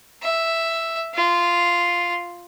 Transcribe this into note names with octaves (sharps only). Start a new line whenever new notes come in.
E5
F4